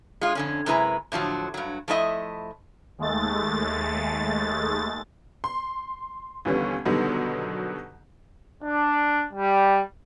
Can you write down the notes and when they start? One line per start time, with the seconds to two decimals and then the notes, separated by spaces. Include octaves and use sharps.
0.21 G#3 F4
0.35 F2 D3 C#4
0.66 F#2 C3 G#3 E4 B4 A#5
1.12 A2 D3 F3 F#3
1.54 G2 F#3
1.88 F3 A3 E4 D#5 E5
2.98 D#2 G#3 A3 A6
5.44 C6
6.45 D#2 D3 E3 G3 B3 C#4
6.85 B2 D3 D#3 F#3 G3 B3
8.63 D4
9.32 G3